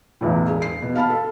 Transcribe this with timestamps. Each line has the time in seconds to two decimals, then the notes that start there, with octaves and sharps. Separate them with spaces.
0.21 B1 E2 A2
0.47 E1 G#4
0.62 C7
0.82 B2
0.95 F5 A5 B5 F6
1.10 A4